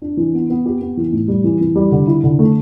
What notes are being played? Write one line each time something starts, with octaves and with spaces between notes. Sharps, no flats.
D4
E3
B3
B3
G4
B3
E3
A2
G3
E3
E3
G3
D3
E4
D3
A3